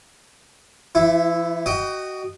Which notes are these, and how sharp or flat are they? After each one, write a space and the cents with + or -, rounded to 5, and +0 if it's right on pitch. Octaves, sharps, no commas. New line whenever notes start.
E3 +45 E4 +0
F#4 +25 D#5 -10 G5 +0